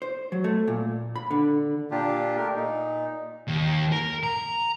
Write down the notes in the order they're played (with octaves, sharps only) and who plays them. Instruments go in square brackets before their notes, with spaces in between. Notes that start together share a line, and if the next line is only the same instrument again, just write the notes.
[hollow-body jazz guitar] C5
F#3
A3
A#2
B5
D3
[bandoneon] A#2 A#3 D4 F4 G4
A3 G4 A#4
A#2 D#4
[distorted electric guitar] D#2
A#4
A#5